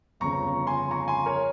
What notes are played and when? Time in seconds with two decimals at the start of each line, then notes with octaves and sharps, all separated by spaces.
0.20 G1 F2 C#3 A#5 C#6
0.67 G#5 C6
0.91 A#5 C#6
1.08 G#5 C6
1.26 A#4 C#5